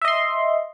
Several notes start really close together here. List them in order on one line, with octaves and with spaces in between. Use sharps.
E5 D#5 C6